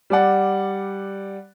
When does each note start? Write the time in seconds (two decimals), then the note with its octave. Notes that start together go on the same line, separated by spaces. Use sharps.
0.10 G3 D5 F#5